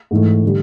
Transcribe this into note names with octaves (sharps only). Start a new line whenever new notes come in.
G#2 E3 A3
D3 G3